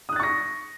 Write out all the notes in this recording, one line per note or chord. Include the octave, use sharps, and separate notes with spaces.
C#6 D#6 F#6 A6 A#6